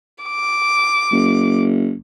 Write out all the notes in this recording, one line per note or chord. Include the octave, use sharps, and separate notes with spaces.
D6
F#1